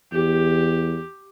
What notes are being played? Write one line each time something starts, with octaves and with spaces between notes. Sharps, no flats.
E2 G4